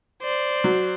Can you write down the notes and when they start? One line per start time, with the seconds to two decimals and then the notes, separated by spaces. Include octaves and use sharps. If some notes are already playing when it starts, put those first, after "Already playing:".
0.23 C5 D5
0.64 F#3